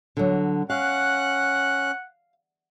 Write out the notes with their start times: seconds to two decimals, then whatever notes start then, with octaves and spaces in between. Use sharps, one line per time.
0.17 D3 F#3
0.70 C#4 F5 F#5 F#6